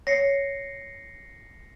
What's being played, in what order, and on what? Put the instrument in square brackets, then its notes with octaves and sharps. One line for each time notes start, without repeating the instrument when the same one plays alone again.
[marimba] C#5 [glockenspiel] A#6 C7 C#7